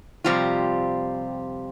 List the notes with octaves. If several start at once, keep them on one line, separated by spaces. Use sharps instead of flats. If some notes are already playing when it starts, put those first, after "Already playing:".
F2 C3 G3 C4 F4